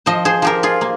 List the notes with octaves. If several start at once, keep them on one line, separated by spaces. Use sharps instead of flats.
F3 C5 D#5
G#4 C5
F3 G4 A#4
F4 G#4
A#3